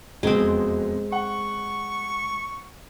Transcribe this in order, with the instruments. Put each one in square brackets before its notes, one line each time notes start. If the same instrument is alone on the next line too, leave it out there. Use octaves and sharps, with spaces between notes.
[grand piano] E1 F2 B2 [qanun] G#3 C4
[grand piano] F#5 [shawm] C#6